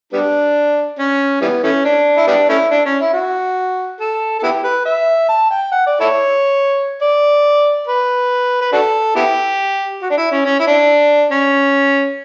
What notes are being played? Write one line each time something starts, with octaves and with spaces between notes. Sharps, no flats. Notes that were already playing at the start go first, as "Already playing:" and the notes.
G3 B3 D4
C#4
E3 G3 B3
E3 A3 C#4
D4
E4
G3 B3 D4
A3 C#4 E4
D4
C#4
E4
F#4
A4
A4
B3 E4 G4
B4
E5
A5
G5
F#5
D5
E4 A4 C#5
D5
B4
B4
D4 F#4 A4
B3 E4 G4
F#4
D4
E4
C#4
C#4
E4
D4
C#4